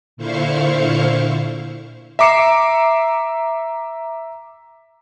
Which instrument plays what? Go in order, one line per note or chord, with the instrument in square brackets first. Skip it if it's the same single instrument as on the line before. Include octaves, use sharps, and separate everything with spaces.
[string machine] A#2 D3 E4 C5 F5 C#6
[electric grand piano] E5 A#5 D6 C7 C#7 E7